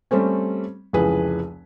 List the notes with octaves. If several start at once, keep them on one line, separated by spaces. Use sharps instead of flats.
G3 A3 C4 C#4
F1 C#2 E3 G#4 B4